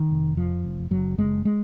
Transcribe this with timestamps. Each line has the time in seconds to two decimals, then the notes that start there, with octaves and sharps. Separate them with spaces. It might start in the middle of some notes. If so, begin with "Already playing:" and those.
Already playing: D#3
0.11 F1
0.37 F2 F3
0.64 F1
0.91 F#1 F#3
1.18 F#1 G#3
1.45 G#3